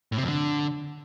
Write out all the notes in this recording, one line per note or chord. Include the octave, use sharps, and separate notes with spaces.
A2
C3
F2
D3